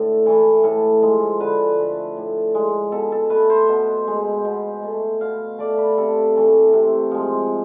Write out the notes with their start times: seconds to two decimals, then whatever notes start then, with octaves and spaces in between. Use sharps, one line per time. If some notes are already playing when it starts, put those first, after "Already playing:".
Already playing: A2 D3 A3
0.26 E3 A3
0.64 A2 A4
1.02 F3 G#3
1.40 D3 B4
1.79 A3
2.17 A2
2.55 G#3
2.92 B2 A4
3.12 A4
3.30 A3 B4
3.50 C5
3.69 B2
4.07 G#3
4.45 B2
4.83 A3
5.21 B2 F5
5.59 A3 D5
5.78 B4
5.97 C3 A4
6.36 E3 A3
6.73 C3
7.11 F3 G#3